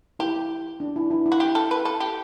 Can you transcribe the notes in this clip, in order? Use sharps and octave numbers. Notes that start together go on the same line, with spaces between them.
E4 G4
D4
E4
E4
E4
F#4
G4
A4
B4
A4
G4